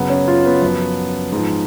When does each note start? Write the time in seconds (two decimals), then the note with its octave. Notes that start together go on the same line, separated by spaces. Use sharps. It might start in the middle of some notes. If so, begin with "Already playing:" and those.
Already playing: F#2 C#3 F#3 B3
0.10 C#4
0.28 F4
0.46 B3
0.62 F#2 F3
1.32 G#2 F3